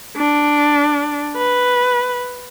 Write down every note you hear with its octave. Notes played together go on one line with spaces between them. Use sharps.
D4
B4